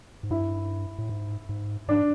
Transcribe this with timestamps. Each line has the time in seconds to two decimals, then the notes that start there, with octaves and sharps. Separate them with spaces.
0.23 G#2
0.31 G2 E4
0.98 A2
1.09 G#2
1.49 G#2
1.88 G#2 D4